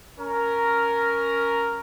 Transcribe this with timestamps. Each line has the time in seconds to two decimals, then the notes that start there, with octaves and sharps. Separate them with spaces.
0.19 C#4 A#4